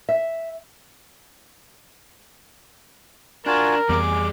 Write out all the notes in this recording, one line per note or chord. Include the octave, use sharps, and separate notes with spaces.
E5
D4 F4 F#4 A#4 G#5
F2 E3 G3 B3 G#4 D6